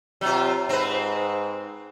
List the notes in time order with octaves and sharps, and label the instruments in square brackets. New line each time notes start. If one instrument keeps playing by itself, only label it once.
[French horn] C3 [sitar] F#3 F4
[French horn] G#2 [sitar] C4 B4